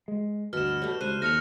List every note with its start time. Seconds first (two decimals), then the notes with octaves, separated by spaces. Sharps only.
0.08 G#3
0.53 G1 D2 B2 F6 E7
0.82 G3 A3
1.01 C#2 C5 F#6 D#7
1.22 D#2 A3 F6 A#6 C#7 F7